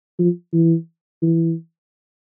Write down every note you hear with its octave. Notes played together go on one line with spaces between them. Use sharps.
F3
E3
E3